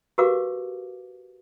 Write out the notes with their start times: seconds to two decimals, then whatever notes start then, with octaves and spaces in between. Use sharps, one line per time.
0.18 F#4 G4 A#4 B4 F5 D6